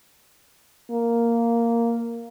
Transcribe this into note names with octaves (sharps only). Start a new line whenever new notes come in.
A#3